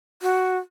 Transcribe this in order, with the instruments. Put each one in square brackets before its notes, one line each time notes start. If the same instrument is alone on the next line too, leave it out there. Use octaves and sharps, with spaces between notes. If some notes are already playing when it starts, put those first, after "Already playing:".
[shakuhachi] F#4